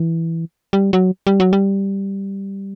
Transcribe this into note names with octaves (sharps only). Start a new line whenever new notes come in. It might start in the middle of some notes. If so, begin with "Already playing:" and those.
Already playing: E3
G3
F#3
G3
F#3
G3